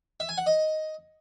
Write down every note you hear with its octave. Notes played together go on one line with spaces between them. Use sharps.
E5
G#5
F#5
D#5